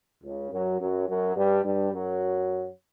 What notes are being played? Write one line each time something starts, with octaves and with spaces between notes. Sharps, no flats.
C#2 C#3
F#2 F#3
F#2 F#3
F#2 F#3
G2 G3
G2 G3
F#2 F#3